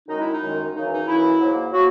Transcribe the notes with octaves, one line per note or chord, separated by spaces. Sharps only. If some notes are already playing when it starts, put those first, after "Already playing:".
F#2 D#3 G#3 D#4
E4
D#4
F#2 D#3 G#3
F#2 C#3 E3 D#4
D#4
F#2 C#3 E3 E4
G#2 F#3 A#3
F#3 A#3 F#4